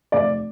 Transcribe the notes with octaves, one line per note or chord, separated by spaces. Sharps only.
F1 D5